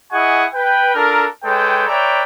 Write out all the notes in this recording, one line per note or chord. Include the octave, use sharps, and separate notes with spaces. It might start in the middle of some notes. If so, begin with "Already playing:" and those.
E4 G#4 D#5 F#5 G#5 C#6
B4 G5
D4 F4 A4 A#4
G#3 A4 B4 C#5 G5
B4 C#5 D5 E5 G5 A#5